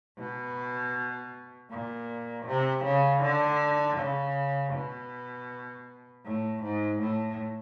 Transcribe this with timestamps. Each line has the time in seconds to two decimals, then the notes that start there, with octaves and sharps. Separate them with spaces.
0.19 B2
1.70 A#2
2.46 C3
2.84 C#3
3.22 D3
3.98 C#3
4.73 B2
6.25 A2
6.63 G#2
7.01 A2